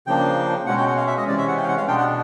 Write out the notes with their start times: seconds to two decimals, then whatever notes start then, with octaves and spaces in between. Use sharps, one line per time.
0.07 C#3 F3 A#3 D4 G5
0.66 B2 G#3 C#4 F#5
0.78 G5
0.87 F#5
0.97 F5
1.07 E5
1.17 D#5
1.27 C3 E3 G#3 C#4 D5
1.38 E5
1.48 F#5
1.57 G5
1.63 F5
1.68 F#5
1.78 F5
1.88 B2 G#3 B3 D4 G5
1.98 F#5